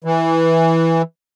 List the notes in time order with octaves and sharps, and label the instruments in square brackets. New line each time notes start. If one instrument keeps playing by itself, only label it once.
[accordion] E3